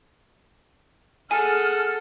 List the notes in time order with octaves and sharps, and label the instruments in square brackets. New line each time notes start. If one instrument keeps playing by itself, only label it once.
[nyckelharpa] G#4 F#5 [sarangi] A4 [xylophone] G#5 [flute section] F6